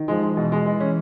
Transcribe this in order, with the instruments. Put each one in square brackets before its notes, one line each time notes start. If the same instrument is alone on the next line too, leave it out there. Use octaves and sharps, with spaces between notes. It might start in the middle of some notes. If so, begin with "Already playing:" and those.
Already playing: [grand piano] D#3
[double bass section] F3 [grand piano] G#3
[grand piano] G#3
[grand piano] B2 [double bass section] E3
[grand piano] G#3
G#3
C#4